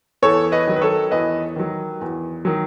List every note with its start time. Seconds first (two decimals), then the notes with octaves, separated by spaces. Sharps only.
0.22 E2 A4 C#5
0.52 B4 D#5
0.67 D#3 F#3
0.76 B4
0.81 A4 C#5
1.11 E2 B4 D#5
1.56 D#3 F#3
2.01 E2
2.45 D#3 F#3